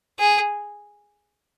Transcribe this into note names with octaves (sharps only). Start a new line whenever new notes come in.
G#4